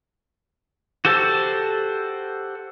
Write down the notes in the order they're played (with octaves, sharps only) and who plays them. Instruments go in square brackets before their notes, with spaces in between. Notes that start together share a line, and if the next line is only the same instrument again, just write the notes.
[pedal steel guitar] F#4 G4 A4 C5 A5